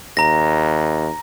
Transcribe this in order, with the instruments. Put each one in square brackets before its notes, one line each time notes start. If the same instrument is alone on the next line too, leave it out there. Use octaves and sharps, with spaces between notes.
[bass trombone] D#2 [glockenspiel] A#5 A#6